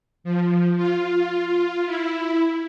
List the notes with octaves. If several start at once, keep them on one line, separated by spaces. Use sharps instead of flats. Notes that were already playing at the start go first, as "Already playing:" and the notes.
F3
F4
E4